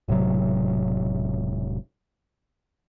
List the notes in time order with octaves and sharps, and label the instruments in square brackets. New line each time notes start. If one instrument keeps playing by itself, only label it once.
[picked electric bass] E1 A2 C3 F#3